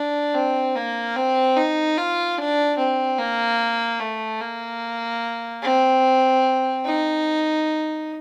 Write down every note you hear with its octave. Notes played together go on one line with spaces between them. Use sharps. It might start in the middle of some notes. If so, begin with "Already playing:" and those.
Already playing: D4
C4
A#3
C4
D#4
F4
D4
C4
A#3
A3
A#3
C4
D#4